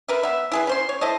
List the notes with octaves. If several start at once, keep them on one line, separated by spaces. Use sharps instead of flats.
A#4 B4 E5
B3 E5
E4 G#4 B4
C#4 C5 C6
C#5
E4 A4 C5 D#5